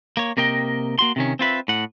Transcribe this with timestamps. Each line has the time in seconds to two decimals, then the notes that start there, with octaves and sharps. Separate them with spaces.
0.17 A#3 C#5
0.37 C3 A#3 A#4 D#5 G5
0.99 A#3 F#4 C6
1.16 C3 D#3 C#4
1.39 C4 F4 B4 E5
1.68 A2 F#5